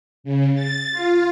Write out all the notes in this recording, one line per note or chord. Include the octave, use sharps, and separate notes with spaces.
C#3
A6
F4